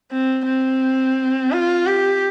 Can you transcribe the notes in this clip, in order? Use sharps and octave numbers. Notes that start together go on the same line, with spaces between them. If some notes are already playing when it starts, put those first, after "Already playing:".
C4
C4
F4
G4